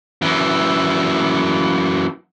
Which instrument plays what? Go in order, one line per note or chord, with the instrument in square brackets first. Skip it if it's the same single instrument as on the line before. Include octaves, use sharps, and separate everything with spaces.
[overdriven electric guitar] F#2 E3